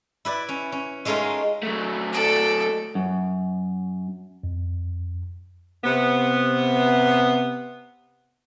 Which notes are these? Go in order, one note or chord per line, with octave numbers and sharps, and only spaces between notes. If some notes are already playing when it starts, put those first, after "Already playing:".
E4 B4 D5
C#4
C#4
G#3 A3 C#4 D#4 F4 A#4
F#3 A3
A4 D5
F#2
F2
C3 B3